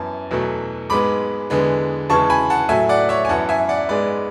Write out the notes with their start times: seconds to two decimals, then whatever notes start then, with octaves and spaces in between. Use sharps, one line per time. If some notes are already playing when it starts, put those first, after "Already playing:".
Already playing: F#2 E3 B3 A5
0.31 E2 B2 F#3 A3
0.90 G#2 G#3 B3 B5 D6
1.50 E2 D3 G#3 B3
2.10 E2 C#3 E3 G#3 A5 C#6
2.30 G#5 B5
2.50 F#5 A5
2.69 A2 F#3 A3 E5 G#5
2.89 D5 F#5
3.09 C#5 E5
3.25 G#5
3.29 F#2 E3 B3 F#5 A5
3.49 E5 G#5
3.69 D5 F#5
3.89 G#2 G#3 B3 B4 D5